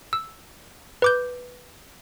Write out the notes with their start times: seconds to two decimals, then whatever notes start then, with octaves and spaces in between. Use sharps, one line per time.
0.13 E6
1.02 B4 D6 G6